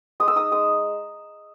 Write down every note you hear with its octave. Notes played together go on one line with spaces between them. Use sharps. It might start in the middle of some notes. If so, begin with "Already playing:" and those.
G#3 D#6
E6
D#4 D#6
G#3 D#6